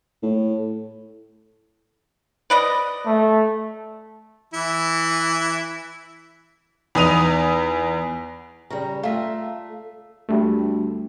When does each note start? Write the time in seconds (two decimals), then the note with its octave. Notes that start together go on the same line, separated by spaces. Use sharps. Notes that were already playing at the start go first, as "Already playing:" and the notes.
0.23 A2
2.50 B4 D5 D#5
3.06 A3
4.54 E3 E4
6.95 E2 D#4 B4 D#6 D#7 F7
8.70 C#3 G3 A#5
9.03 A3 F4 E5 A#5
10.29 D2 G3 A3